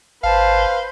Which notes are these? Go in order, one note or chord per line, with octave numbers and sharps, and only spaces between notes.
G#1 B4 C5 F5 A5